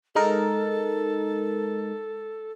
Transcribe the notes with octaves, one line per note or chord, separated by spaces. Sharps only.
G#3 D#4 A4 A#4